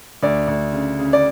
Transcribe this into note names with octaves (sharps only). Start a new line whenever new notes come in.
D2 D5
D2
C#3
C#3
D5